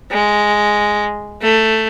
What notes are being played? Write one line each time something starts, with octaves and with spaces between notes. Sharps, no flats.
G#3
A3